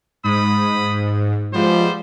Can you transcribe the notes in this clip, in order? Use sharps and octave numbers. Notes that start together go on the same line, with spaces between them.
G#2 B5 D#6
F3 G3 G#3 B3 F4 C5